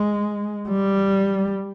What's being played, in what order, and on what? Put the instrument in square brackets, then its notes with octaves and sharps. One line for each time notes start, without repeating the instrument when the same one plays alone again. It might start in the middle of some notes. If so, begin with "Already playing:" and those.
Already playing: [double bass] G#3
G3